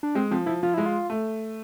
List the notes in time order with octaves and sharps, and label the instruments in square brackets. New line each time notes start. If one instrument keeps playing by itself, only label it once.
[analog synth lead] D4
[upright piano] G#3 [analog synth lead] C4
[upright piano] F3 [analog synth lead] C4
[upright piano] F3 [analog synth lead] E4
[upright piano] F3 [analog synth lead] F4
[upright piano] G#3 [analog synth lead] E4
[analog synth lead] F4
[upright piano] A3